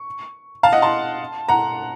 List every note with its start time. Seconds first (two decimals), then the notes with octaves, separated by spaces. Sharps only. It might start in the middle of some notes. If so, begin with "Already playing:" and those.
Already playing: C#6
0.63 F5 A5
0.72 D#5 F#5
0.82 A5 C6
1.49 F#5 A#5